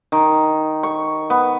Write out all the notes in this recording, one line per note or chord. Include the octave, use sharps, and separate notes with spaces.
D#3
C#6
B3